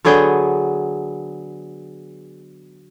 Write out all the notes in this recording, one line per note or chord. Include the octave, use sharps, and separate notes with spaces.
D3 F#3 B3 G#4 G5